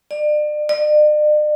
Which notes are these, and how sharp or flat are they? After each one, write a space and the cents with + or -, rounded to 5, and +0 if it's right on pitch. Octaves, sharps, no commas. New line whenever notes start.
D5 +35
D5 +45